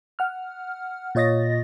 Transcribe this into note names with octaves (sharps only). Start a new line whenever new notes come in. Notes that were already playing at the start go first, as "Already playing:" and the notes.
F#5 F6
A#2 F4 C#5 D#5 A6 A#6